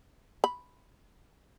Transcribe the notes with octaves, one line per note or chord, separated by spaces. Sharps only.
B5